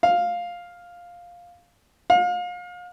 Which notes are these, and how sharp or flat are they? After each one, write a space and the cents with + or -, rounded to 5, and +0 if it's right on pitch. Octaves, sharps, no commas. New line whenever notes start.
F5 +5
F5 +35